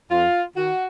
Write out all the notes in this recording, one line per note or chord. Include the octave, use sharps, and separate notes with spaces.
F2 F4
D#3 F#4